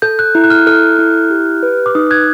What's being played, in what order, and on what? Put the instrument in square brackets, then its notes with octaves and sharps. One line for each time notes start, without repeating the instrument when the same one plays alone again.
[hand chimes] A4 [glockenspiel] G6
[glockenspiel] F#6
[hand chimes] E4
[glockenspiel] F#6
F6
[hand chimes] A4 [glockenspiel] F6
[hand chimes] E4
G4
B4
[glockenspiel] D6
[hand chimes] D#4 [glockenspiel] D#6
[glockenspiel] F#6 G#6